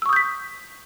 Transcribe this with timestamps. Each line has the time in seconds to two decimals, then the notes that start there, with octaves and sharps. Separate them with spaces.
0.02 E6
0.06 C#6
0.09 D#6
0.13 G6
0.16 B6